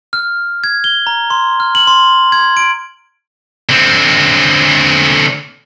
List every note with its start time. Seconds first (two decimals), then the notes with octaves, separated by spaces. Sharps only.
0.13 F6
0.64 G#6
0.84 G7
1.07 A#5
1.30 C6
1.60 F6
1.75 F#7
1.87 C6
2.32 G#6
2.57 D7
3.69 D3 C4